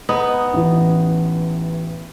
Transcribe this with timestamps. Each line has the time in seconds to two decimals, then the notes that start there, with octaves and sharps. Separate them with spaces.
0.09 B3 D#4
0.53 A1 E3